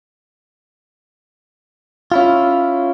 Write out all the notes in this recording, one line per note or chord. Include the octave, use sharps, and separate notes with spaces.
C#4 E4 F4